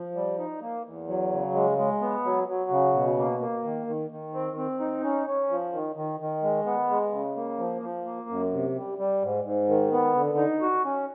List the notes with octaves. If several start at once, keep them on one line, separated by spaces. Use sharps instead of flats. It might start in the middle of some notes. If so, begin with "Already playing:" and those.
Already playing: F3
G3
D#4
A#3
E2
F#3
C#3
G#3
G#3
B3
F#3
F#3
C#3
B2
A#3
A#3
D#3
D#3
D#3
C4
C4
D#4
C#4
C#4
F3
D#3
D#3
D#3
G#3
B3
G#3
C#3
A#3
F3
F3
A#3
F#2
C3
G3
G3
G#2
G#2
D#3
B3
D3
D#4
F#4
C#4